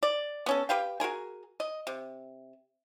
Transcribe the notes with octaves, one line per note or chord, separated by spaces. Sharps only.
D5
B3 C#4 A4
G4 B4 F5 G5
F#4 G#4 A#4 G#5
D#5
C3